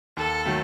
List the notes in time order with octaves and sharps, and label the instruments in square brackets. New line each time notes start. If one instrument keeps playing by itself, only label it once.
[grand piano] D#2 [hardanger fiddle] A4
[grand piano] D#3 F#3 A3